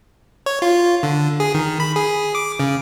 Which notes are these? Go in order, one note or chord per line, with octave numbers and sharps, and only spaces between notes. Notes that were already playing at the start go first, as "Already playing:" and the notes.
C#5
F4
D3
G#4
D#3
B5
G#4
D6
C#3